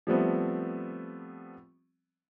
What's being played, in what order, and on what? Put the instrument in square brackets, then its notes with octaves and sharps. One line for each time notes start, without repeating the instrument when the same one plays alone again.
[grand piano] F3 G3 A3 B3 C4